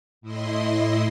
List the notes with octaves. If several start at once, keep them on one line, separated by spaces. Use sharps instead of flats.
A2 E4 D#5 C6